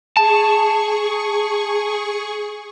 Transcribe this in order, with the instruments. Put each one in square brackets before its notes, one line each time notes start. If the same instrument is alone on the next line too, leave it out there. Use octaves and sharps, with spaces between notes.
[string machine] G#4 C#6 [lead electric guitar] A5